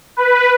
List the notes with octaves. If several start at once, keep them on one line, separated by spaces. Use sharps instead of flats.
B4